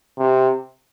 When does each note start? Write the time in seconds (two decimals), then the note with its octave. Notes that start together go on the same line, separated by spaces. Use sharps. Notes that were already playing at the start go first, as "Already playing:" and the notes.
0.18 C3